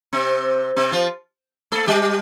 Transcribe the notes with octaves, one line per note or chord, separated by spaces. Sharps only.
C3 C4
C3 C4
F3 F4
A3 A4
G3 G4